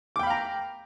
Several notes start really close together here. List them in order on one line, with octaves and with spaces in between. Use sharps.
D6 G5 B5 F5 A#5